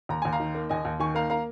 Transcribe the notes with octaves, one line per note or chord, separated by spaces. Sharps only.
D#2 A#5
D#2 G#5
F5 A#5
D#3
A#3
D#2 D#5 G#5
D#2
D#3 G#5 C#6
A#3 F5 A#5
A#3 F5 A#5